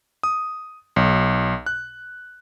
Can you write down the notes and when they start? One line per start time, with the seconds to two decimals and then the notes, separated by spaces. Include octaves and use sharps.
0.23 D#6
0.96 B1
1.66 F#6